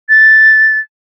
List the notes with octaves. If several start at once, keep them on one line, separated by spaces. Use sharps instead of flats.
A6